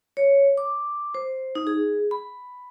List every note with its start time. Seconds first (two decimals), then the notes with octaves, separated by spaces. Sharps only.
0.17 C#5
0.58 D6
1.15 C5
1.55 D#4
1.67 G#4
2.11 B5